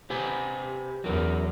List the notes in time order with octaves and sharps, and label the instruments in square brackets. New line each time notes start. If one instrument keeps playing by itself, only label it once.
[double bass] C3 [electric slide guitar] G4 B4 G#5
[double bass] E2 [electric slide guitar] F#3 A#4